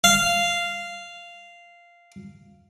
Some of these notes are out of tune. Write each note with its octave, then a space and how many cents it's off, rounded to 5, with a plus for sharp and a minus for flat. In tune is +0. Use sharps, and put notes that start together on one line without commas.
F5 -10